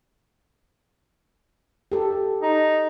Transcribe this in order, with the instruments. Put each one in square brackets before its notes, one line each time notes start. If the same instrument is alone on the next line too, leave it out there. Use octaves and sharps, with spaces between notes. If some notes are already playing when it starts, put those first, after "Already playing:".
[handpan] G4 A4
[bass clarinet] D#4